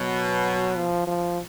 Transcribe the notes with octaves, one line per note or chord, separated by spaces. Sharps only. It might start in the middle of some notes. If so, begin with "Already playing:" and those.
Already playing: B2 F#3
F3
F3